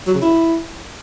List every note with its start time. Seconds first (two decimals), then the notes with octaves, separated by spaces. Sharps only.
0.07 F#3
0.14 C#3
0.21 E4